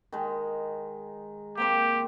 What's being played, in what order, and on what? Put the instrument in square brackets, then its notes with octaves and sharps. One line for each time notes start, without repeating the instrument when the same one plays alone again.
[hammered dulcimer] D#3 G#3
[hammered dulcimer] A#3 C4 C5 [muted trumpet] G4